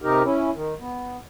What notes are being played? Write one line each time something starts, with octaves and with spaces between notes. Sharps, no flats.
C3 D#4 G4 A#4
C#4 E4
D#3
B3